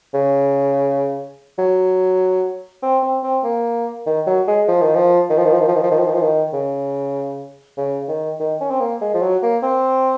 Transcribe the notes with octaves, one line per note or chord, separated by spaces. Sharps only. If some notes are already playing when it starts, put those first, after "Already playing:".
C#3
F#3
C4
C4
C4
A#3
D#3
F#3
G#3
F3
D#3
F3
D#3
F3
D#3
F3
D#3
F3
D#3
F3
D#3
F3
D#3
F3
D#3
C#3
C#3
D#3
D#3
C#4
C4
A#3
G#3
F3
F#3
A#3
C4